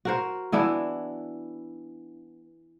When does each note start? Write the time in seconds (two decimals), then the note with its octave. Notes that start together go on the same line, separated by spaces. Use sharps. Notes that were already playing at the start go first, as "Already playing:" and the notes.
0.05 F#4 A#4 C5
0.52 E3 B3 D4 E4